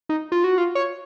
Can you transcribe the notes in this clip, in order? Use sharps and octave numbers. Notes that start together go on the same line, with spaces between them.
D#4
F4
F#4
F4
C#5